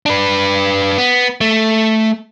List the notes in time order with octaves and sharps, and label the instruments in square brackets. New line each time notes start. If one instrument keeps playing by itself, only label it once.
[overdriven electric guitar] D4 B4
B3
A3